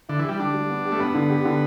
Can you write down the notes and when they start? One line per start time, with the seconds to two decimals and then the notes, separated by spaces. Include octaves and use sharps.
0.09 D3 E4
0.19 E3 G4
0.29 G3
0.40 D3 D4
0.54 G3
0.70 B3
0.85 G4
0.92 A3
0.99 G2 B3
1.15 D3
1.30 G4
1.45 D3